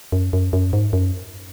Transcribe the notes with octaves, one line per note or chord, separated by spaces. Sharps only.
F#2
F#2
F#2
G#2
F#2